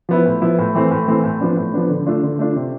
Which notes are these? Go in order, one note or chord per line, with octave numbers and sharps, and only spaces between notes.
F3 B3 E4
A2
F3 B3 E4
A2
E3 A3 C4
A2
E3 A3 C4
A2
F3 B3 D4
A2
F3 B3 D4
D3
A3 D4 F4
D3
A3 D4 F4
C3